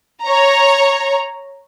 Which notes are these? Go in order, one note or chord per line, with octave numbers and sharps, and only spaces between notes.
C#5 A#5